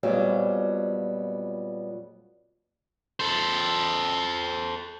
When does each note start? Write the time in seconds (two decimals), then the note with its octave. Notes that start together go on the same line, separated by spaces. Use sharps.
0.03 F2 A#2 F#3 G3 B3
3.20 A4 C5